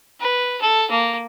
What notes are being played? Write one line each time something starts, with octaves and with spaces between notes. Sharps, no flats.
B4
A4
A#3